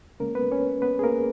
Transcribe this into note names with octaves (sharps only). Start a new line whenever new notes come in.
C#3 G#3 A#3 C#4 A#4
B3 B4
C#4 C#5
B3 B4
G#4
A#3 A#4